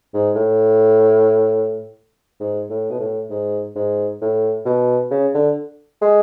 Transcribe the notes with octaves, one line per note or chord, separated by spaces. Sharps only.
G#2
A2
G#2
A2
B2
A2
G#2
G#2
A2
B2
C#3
D3
G#3